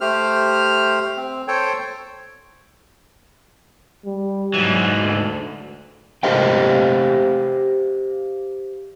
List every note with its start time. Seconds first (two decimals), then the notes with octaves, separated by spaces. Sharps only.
0.01 A3 G4 C5 F6
1.17 C4
1.48 A4 C5 C#5 G5
4.06 G3
4.54 G#2 E3 F#3
5.01 D2
6.23 G4 C5 D#5 F5 G5